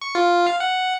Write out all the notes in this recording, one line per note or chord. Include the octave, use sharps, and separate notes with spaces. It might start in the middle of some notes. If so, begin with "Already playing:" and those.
C#6
F4
F5
F#5